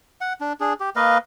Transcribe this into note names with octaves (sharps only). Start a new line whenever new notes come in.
F#5
D4
D4 G#4
G4
A#3 B4 D#5 F5